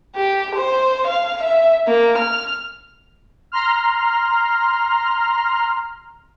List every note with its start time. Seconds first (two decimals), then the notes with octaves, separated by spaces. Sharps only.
0.16 G4
0.55 C5
1.07 F5
1.43 E5
1.88 A#3
2.17 F6
3.52 A#5 C6 F6